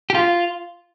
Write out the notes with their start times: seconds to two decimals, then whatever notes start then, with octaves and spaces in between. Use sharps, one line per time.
0.10 G4
0.15 F4